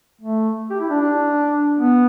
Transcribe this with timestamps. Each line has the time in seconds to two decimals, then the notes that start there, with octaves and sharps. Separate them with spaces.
0.21 A3
0.70 G4
0.80 E4
0.90 D4
1.01 D4
1.79 B3